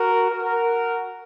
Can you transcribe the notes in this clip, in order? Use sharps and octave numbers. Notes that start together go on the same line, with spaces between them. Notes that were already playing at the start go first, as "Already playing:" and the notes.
Already playing: F#4 A#4
F#4 A#4